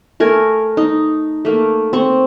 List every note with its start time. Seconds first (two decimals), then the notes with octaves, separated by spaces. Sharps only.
0.20 A3 A#4 G#5
0.77 D#4
1.45 A3 A#3
1.93 C4 C#6